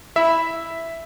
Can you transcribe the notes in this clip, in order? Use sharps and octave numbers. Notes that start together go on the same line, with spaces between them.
E4 E5